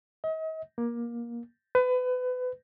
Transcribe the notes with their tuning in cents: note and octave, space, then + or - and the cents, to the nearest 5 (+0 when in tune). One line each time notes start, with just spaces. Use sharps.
D#5 +40
A#3 +20
B4 +30